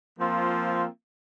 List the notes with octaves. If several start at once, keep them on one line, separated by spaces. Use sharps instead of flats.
F3 A#3 C4 F4